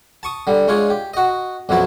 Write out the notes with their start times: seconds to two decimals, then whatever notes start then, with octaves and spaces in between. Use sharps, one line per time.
0.23 A5 C#6 D#6
0.47 D3 G3
0.68 G#3 D4 F4 G#4 C#5
0.90 G4
1.14 F#4 D#5
1.69 B1 F#2 F3 F#3 E4 A5